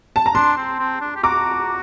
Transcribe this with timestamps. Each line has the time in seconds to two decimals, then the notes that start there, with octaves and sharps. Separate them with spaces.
0.16 A5
0.26 A#5
0.34 D4 A5 C6
0.57 C4
0.79 C4
1.01 D4
1.16 G4
1.23 F#4 A#5 D6